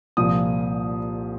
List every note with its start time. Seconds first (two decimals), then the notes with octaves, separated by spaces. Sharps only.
0.17 C2 A#2 F3 D#6